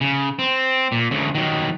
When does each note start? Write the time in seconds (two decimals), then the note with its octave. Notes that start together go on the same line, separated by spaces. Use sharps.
0.01 C#3
0.39 C4
0.92 A#2
1.11 D2 C#3
1.35 D#3 F#3